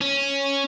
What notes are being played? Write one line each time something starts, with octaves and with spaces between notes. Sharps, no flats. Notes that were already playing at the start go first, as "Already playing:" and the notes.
C#4